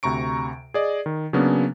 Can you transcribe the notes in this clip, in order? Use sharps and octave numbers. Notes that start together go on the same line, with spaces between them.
D2 C3 A#5 C#6 D7
G#4 D5 D#5
D#3
C#3 F#3 A#3 B3 C#4 D4